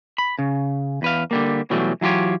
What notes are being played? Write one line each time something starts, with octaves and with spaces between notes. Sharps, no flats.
B5
C#3
E2 B4 F5
D3 G3 A#3
B2 E3 F#3 G3 A3
E3 F#3 F4 G4 C#5